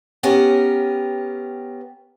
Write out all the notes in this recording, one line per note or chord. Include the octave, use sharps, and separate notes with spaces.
B3 C#4 G4 A#4